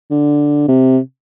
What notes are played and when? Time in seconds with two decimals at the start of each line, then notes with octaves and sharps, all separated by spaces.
0.11 D3
0.68 C3